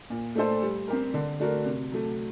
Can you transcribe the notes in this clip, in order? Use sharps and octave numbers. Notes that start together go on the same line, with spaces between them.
A#2
A3 D4 A4 C5
G3
C4 G4 A#4
D3
A3 D4 F#4 A#4
C3
F#3 A3